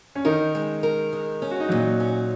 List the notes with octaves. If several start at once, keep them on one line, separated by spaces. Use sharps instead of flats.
C#4
D#3 D#4 A#4
G#3
A#4
G#3
C#4
F#4
D#4
A#2 F#3 F#4
C#4